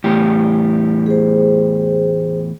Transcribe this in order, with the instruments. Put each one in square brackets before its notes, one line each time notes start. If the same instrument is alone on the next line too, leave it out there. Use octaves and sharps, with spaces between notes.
[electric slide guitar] E2 A2 G4
[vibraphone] G#4 C5